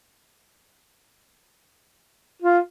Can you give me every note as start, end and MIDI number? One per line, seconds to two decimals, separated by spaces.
2.42 2.59 65